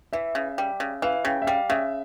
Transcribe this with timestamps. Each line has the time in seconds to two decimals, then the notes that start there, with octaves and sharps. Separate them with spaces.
0.13 E3 E5
0.35 C#3
0.58 G3
0.80 C#3
1.02 E3 F5
1.24 C#3 G5
1.42 E5
1.47 G3 F5
1.70 C#3 E5